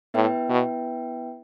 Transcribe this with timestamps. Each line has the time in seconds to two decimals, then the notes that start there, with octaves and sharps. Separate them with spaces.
0.14 A2 B3 E4 B4 E5 G5
0.50 B2